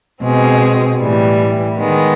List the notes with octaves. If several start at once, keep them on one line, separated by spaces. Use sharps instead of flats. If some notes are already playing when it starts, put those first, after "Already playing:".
B2 G#3 C4
A2 E3 G3
D#3 G#3 B3